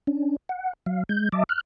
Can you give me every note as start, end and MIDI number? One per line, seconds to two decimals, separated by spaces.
0.07 0.36 61
0.07 0.36 62
0.49 0.73 78
0.86 1.03 54
0.86 1.03 77
1.09 1.29 56
1.09 1.29 91
1.32 1.44 54
1.32 1.44 75
1.32 1.44 76
1.32 1.44 81
1.32 1.44 86
1.49 1.61 89
1.49 1.61 90